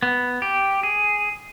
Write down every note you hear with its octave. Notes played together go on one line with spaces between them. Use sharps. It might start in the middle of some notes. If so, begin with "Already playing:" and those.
B3
G4
G#4